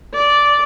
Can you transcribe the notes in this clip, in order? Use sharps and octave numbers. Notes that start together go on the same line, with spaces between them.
D5